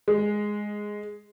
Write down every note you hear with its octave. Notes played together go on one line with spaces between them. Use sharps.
G#3